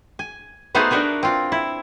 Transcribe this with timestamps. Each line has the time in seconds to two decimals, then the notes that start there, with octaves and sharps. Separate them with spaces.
0.19 G#5
0.75 A3 B3 D#4 F#4 G#4 C5
0.91 D4 F#4 A#4 B4
1.23 C4 F4
1.52 E4